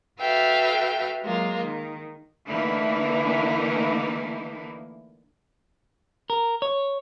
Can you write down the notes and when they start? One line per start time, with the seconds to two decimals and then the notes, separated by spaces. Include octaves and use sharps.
0.19 F#4 A4 B4 E5 F5 G5
1.22 F#3 G#3 A#3 F4
1.62 D#3
2.48 D3 E3 A3 A#3 D#4 E4
6.30 A#4
6.62 C#5